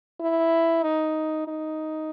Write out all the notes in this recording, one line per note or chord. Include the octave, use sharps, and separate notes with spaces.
E4
D#4
D#4